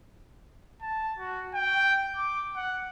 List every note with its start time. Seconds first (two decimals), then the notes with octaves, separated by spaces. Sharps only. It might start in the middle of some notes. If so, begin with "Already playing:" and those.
0.82 A5
1.19 F#4
1.54 G5
2.17 D6
2.56 F#5